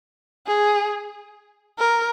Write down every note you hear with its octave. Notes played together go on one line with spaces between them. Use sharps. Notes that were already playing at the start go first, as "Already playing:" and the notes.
G#4
A#4